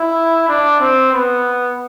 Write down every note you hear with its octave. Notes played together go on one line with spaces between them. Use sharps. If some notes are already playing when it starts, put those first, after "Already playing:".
Already playing: E4
D4
C4
B3